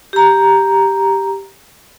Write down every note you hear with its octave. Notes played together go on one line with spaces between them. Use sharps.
G4 A#5